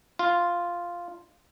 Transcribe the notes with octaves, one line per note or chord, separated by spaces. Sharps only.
F4